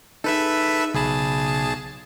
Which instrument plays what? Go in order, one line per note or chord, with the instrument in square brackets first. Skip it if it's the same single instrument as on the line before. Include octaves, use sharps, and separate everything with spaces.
[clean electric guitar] D#4 G#4 [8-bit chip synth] A4 B4 E5
[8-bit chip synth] B1 G#4 A5 [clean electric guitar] C#3 B5